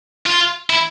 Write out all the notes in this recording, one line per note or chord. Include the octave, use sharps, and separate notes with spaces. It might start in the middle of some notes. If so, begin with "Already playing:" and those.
F4
E4